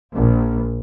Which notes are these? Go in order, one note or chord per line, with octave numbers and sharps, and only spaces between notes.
A#1